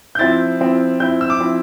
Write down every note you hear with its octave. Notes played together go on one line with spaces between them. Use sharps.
G6
F3 C4 E4 A6
F3 C4 E4
F3 C4 E4 G6
E6
D6
F3 C4 E4